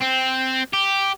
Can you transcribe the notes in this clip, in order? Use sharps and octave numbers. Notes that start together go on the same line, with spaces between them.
C4
G4